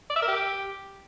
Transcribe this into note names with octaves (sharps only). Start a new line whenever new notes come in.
D5
E5
A#4
G4